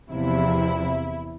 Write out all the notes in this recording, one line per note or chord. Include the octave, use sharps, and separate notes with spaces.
E2 C3 F3 E4